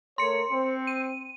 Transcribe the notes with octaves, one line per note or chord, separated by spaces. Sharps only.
A3 A#4 C#5 C6 C#7
C4
D#7